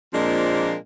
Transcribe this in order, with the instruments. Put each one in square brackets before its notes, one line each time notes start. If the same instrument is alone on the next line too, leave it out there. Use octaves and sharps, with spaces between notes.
[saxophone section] A#2 F3 G#3 A#3 C4 D4